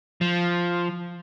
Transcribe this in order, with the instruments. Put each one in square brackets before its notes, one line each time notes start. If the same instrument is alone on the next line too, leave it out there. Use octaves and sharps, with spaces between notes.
[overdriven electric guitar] F3